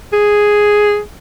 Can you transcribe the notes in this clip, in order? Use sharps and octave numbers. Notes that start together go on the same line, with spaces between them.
G#4